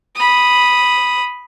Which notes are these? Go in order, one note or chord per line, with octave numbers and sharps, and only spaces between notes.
B5 D#6